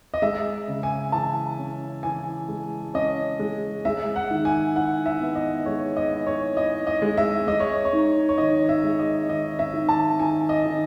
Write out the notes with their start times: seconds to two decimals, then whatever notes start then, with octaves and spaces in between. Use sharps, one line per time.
0.14 D#5
0.22 G#3 E5
0.68 C#3
0.83 G#5
1.12 E3 A5
1.58 C#4
2.03 E3 G#5
2.48 G#3
2.94 C#4 D#5
3.39 G#3
3.85 G#3 E5
4.16 F#5
4.31 D#3
4.45 G#5
4.75 E4 F#5
5.06 E5
5.21 B3
5.35 D#5
5.66 G#3 C#5
5.97 D#5
6.11 E4
6.27 C#5
6.57 E4 D#5
6.87 D#5
7.02 G#3
7.17 E5
7.47 G#3 D#5
7.60 C#5
7.85 C#5
7.93 D#4
8.29 C#5
8.38 D#3 D#5
8.69 E5
8.84 G#3
8.99 D#5
9.29 D#3 D#5
9.59 E5
9.73 D#3
9.89 A5
10.20 D#3 G#5
10.49 D#5
10.65 D#3